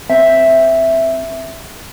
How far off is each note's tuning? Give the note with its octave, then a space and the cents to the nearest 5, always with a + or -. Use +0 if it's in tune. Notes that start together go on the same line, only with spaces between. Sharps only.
C4 +0 E5 +0